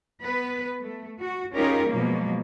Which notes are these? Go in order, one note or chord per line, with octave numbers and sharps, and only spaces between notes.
B3 B4
A3
F#4
C#4 D#4 F4 G4 G#4 A#4
B2 F3 F#3 G#3 A#3